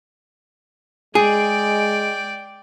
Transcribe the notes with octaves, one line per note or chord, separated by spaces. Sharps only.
G#3 G#4 D5 G5